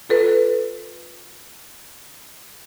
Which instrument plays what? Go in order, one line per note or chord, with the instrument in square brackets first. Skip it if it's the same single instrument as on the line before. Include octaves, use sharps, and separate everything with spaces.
[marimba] F4 A4 B4